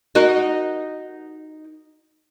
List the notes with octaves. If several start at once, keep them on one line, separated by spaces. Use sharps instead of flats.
D#4 F#4 A#4